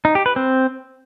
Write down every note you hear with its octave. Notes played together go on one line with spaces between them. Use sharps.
D#4
G4
B4
C4